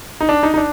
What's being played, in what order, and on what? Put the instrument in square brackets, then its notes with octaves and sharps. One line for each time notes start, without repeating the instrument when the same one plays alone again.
[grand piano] D#4
D4
D#4
D#4
D4